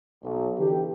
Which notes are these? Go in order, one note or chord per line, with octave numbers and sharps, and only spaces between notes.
B1
D3 E3 G4